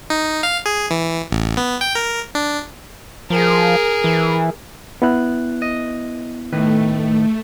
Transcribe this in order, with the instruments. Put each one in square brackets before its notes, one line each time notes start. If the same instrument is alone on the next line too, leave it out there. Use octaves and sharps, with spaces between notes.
[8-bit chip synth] D#4
F5
G#4
E3
A1
B3
G5
A#4
D4
[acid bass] F3 [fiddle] G#4 A#4
[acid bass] E3
[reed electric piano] B3 E4 F#6
[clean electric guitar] D#5
[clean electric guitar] A2 D#3 B4 [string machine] A3